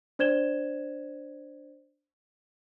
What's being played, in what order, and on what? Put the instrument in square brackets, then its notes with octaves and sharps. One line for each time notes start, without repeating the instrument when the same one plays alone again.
[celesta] D4 C5 D5 G#6 E7 G7